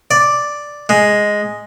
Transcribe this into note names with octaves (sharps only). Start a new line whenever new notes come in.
D5
G#3